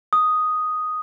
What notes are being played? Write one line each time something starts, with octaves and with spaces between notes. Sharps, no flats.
D#6